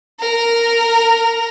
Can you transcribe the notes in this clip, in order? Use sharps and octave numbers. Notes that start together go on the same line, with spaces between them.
A#4 A#5